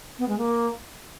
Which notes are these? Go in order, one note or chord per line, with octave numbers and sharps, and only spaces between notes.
B3
G#3
A#3